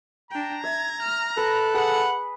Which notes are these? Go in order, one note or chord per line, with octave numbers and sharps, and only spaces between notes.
D4 G5 A#5
E5 G#6
F6
A4 B4 F#6
G#4 B4 F#5